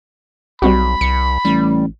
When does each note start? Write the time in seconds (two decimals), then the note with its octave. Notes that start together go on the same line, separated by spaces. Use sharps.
0.62 B1 G3 C4 F#4 B5
1.01 C2 C#7
1.45 A1 G3